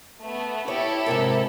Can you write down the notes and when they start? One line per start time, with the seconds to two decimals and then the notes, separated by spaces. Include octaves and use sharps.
0.21 A3 B3
0.68 E4 G4 A4 C#5
1.06 G#2 C3 A#4